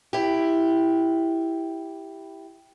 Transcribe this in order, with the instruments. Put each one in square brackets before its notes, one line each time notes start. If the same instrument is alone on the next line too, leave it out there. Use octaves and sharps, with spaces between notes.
[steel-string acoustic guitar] E4 G4